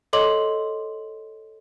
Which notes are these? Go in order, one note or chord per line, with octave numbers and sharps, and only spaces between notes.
A4 C#5 D#5 C6 D6 F#7